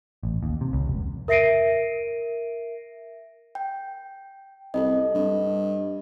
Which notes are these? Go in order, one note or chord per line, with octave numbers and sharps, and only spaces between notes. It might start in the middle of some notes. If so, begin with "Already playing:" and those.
A1
D#2
C3
C#2
F1
A#4 E5 A#6 C7 D7 D#7
G5
C2 A4 D#5
G2